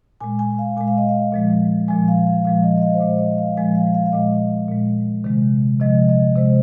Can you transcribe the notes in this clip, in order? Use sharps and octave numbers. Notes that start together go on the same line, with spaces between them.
A#2 G#3 G#5
G#5
F5
A#2 G#3 G#5
F5
D#5
F5
A#2 F3 G#3
A#2 F3 G#3 G#5
F5
F5
A#2 F3 G#3 F5
D#5
D#5
F5
C5
A#2 G#3 D#5
D#5
F5
A#2 F3 G#3 G#5
F5
F5
F5
A#2 G#3 D#5
A#2 G#3
C3 D#3 G#3
C3 F3 G#3 D#5
D#5
C3 G#3 C5